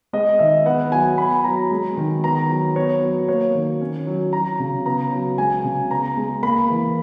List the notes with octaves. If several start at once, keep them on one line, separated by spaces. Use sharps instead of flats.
G#3 D#5
D#3 E5
B3 F#5
F#3 G#5
B3 B5
F#3 A#5
G#3
D#3
B3 A#5
F#3
B3 C#5
F#3
A#3 C#5
D#3
C#4
F#3
F#3 A#5
C#3
B3 A#5
F#3
G#3 G#5
C#3
B3 A#5
G#3
A#3 B5
E3